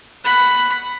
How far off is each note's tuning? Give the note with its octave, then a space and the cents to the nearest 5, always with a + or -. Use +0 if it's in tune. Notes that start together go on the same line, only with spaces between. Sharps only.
F#5 +0 B5 +5